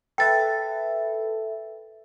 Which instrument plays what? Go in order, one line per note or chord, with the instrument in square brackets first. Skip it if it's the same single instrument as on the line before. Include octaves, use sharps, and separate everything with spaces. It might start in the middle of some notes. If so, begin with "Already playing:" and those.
[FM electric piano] A4 B4 E5 [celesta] G5 A6